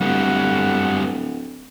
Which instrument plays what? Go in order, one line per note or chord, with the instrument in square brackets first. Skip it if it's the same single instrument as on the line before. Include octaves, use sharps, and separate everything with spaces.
[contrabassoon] D1 [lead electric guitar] G3 B3 [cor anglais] F#5